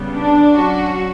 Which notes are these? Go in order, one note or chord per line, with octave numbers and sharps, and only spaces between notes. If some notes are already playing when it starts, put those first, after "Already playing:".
Already playing: C#3 G3 B3
D4
F#3 C#4 F#4